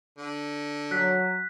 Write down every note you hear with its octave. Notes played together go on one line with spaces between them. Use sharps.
D3
F#3 F#6 B6